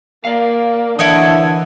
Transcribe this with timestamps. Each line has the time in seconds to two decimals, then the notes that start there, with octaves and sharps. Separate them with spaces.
0.25 A#3 A#4 D5 F5
0.99 D3 E3 E4 B4 C#5 D#5 E5